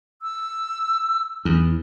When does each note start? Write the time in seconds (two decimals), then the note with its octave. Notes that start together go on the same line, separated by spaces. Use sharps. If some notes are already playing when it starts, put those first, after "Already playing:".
0.22 E6
1.45 E2